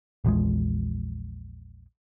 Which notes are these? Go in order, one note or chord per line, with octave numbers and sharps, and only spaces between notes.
A#1 E2 F3 G#3